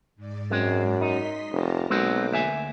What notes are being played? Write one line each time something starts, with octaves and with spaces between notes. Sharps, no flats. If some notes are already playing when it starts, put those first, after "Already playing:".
G#2 D5
F#2 G#3 C4
D#4 D#5 C6 B6
F1 A#4 A5 A#5
B1 G#3 A#3 C4 F#4 D6
D2 E5 G#5